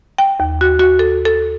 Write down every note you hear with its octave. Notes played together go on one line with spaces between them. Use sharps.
G5
D#2
F#4
F#4
A4
A4